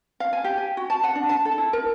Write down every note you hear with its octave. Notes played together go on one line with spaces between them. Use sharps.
F5
G#5
G4
G#5
F#4
A5
F#5
D4
A5
A4
E4
A#4